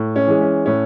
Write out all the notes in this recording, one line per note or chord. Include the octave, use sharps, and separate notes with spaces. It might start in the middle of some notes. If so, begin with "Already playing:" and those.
Already playing: A2
C#4
E3 G#3
C#4
A2 C#4